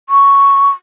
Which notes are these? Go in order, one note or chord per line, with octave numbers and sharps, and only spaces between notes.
C#6